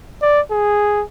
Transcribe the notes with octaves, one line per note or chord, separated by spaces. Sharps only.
D5
G#4